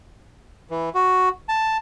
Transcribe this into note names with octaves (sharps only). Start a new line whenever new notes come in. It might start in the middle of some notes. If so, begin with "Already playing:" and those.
E3
F#4
A5